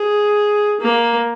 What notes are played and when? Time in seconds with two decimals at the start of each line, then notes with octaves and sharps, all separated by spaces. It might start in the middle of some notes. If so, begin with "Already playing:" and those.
Already playing: G#4
0.81 A#3